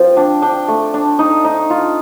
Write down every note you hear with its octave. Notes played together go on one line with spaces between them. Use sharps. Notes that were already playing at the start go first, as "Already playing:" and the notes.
Already playing: F3 C4 F4
D4 G5
D4 G5
A3
D4
D#4
D#4
F4